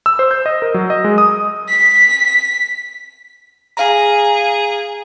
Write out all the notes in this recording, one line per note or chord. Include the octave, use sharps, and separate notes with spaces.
E6
C5
G6
D#5
A#4
F#3
D#5
G#3
D#6
B6
G#4 F5 A#5